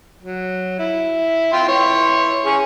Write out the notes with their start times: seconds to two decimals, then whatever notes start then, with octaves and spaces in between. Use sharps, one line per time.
0.22 F#3
0.79 E4
1.53 F4 G5 C6
1.68 E4 C#5 C6
2.46 C#4 G#4 C#6